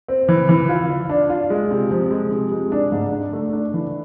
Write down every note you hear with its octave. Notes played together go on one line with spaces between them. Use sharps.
C4
E3
E3
F4
F4
D4
F4
G#3
C3
F3
G#3
C3
G#3
D4
G#2
D4
A3
D4
E3